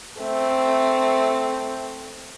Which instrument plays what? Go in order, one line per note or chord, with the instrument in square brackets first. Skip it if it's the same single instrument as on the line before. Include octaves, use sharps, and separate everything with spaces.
[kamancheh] A3 C4